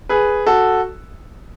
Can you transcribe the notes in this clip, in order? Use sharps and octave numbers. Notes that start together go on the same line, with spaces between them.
G#4 B4
F#4 A4